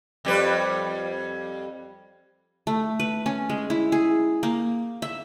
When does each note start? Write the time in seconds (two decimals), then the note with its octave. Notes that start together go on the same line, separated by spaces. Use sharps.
0.25 F2 G3 B4
2.67 A3
3.00 B4
3.26 C#4
3.50 G#3
3.70 E4
3.92 G#4
4.43 A#3
5.02 E5